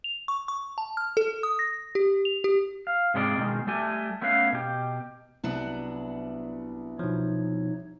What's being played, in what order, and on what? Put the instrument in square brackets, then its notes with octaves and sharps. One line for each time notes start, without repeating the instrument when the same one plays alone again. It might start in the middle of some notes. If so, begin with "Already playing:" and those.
[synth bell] F7
C#6
C#6
A5
F6
A4
D#6
A#6
G4
F7
G4
[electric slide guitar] F5
G#2 C3 G#3 A4 D5
B2 D#3 E3 G#3
G3 A3 G4 G#5
A3 B3 C#4 B4 F5
B2 G4
[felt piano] C2 [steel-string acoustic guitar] F#3 B3 D4
[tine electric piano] B2 F3 [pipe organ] D#4 C#5